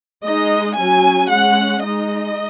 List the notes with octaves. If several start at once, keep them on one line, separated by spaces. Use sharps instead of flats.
G#3 D#4 D#5
F#3 C#4 G#5
G#3 F#5
C#4
G#3 D#4 D#5